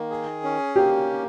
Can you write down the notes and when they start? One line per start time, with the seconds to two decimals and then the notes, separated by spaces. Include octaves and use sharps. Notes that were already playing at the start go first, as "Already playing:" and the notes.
Already playing: D#3 A#3
0.10 G#4
0.44 C#4
0.76 A#3 G4